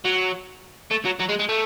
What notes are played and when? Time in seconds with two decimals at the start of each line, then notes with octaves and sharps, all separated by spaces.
0.05 F#3
0.91 A3
1.06 F#3
1.20 F#3
1.29 G#3
1.40 G#3
1.49 A3